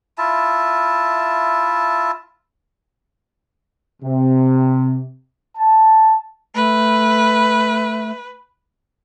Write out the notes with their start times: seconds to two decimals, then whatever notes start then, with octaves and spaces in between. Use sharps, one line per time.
0.18 E4 F4 E5 A5
4.03 C3
5.57 A5
6.55 A3 B4